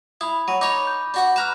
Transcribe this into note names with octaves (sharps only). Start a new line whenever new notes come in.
E4 B5 D#6
F#3 D#7
D#4 C#5 B5 D6
G6
D4 F#4 F#5
B4 A#5 F6 F#6 E7